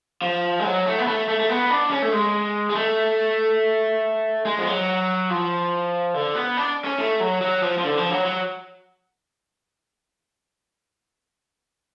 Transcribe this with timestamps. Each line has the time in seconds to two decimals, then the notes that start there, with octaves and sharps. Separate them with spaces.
0.22 F3
0.60 G#3
0.65 F#3
0.86 A3
0.99 B3
1.07 A3
1.28 A3
1.39 A3
1.49 B3
1.70 D4
1.91 C#4
2.02 A3
2.12 G#3
2.70 G#3
2.75 A3
4.45 G#3
4.58 F3
4.67 F#3
5.30 F3
6.14 D3
6.36 B3
6.57 D4
6.84 C#4
6.99 A3
7.20 F#3
7.41 F#3
7.63 F3
7.78 F3
7.84 D3
7.97 F3
8.11 F#3
8.25 F#3